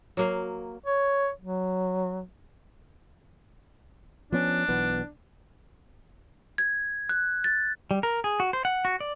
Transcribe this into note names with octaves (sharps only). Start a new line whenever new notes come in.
F#3 A#3 F5
C#5
F#3
F3 B3 C#4 D4
B1 E3 B3
G#6
F#6
A6
G3
A#4
G#4
F#4
C5
F#5
F#4
D5